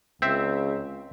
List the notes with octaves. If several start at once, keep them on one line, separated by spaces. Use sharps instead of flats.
C#2 C4 E5